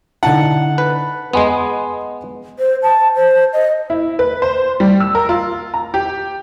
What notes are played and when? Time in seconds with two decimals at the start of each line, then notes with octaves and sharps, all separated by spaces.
0.23 D3 D#4 E4 F#5 A5
0.78 B4
1.33 G#3 B3 D#5 G#5 C6
2.59 C5
2.83 A5
3.15 C5
3.53 D#5
3.90 E4
4.19 B4
4.42 C5
4.80 G3
5.00 E6
5.15 A#4
5.29 F4
5.74 A#5
5.94 G4